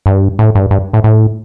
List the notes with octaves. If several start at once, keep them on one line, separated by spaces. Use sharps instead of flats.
G2
A2
G2
G2
A2
A2